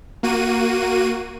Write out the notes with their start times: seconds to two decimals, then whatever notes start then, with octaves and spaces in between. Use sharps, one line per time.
0.23 A#3 F#4 D#7